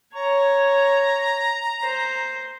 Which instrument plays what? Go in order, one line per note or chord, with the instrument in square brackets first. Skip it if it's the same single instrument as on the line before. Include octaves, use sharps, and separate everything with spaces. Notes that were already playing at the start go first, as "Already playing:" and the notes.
[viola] C#5 [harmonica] A#5
[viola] C5